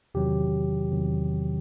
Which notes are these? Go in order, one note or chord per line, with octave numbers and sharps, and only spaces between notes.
E2 C3 D#3 F#3 G4
E2 C3 D#3 F#3